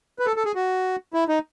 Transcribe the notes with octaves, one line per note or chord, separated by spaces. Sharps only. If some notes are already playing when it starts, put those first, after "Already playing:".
B4
A4
A4
G#4
F#4
E4
D#4